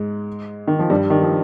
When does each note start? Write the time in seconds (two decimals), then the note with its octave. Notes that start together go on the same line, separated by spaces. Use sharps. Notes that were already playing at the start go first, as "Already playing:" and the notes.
Already playing: G#2 G#3
0.68 D#3
0.79 F3
0.90 G2 G3
1.10 D#3
1.22 F3